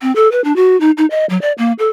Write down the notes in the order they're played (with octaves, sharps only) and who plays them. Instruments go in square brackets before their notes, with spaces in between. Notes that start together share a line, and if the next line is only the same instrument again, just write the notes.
[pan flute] C4
A4
B4
D4
F#4
D#4
D#4
D#5
F#3
D5
A#3
A4